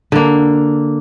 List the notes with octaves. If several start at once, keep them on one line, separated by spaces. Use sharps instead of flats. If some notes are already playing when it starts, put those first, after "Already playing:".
D3 A#3